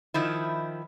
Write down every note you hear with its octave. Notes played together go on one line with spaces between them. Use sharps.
D#3 F3 E4